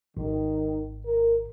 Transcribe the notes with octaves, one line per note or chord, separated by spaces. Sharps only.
G#1 D#3
A#4